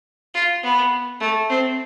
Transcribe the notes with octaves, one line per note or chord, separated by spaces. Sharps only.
F4
B3
A3
C4